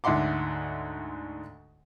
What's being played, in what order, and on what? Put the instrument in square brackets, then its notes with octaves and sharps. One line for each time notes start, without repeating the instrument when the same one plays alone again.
[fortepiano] D2 G#2 E5 F#5 C6 D6